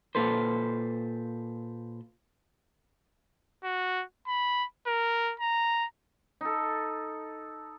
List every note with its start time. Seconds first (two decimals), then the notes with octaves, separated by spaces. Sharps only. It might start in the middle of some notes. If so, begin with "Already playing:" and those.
0.15 A#2 A4 B4 C5
3.64 F#4
4.27 B5
4.87 A#4
5.40 A#5
6.41 D#4 A4